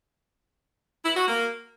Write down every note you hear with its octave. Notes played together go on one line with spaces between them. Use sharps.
E4
F#4
A#3